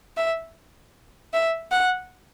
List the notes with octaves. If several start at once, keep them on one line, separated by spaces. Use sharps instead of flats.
E5
E5
F#5